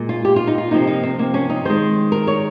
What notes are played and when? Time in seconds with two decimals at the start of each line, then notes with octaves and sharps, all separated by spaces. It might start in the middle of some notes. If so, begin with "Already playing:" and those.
Already playing: A#2 G#3
0.09 F4
0.25 G4
0.36 F4
0.47 D#4
0.58 F4
0.71 C3 F3 A#3 D#4
0.87 D#4
1.03 C4
1.19 A#3
1.34 C#4
1.50 D#4
1.65 D#3 G#3 C5
2.12 A#4
2.27 C#5